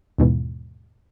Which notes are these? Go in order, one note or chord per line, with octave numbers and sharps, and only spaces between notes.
D#2 G#2 B2 E3